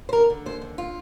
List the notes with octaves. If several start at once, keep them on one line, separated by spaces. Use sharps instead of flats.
C5
D3 A#4
D3
D#2 C5
D3
F4